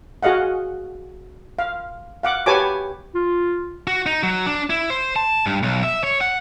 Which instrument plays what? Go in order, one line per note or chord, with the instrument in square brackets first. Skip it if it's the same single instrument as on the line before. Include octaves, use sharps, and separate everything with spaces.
[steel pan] F#4 G#4 D#5 F5 F#5
F5
F5 F#5 D6
G4 B4 C#5 G#5 A5 D6
[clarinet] F4
[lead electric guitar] F#4
D#4
F#3
D4
E4
C5
A5
G2
B1
E5
C#5
F#5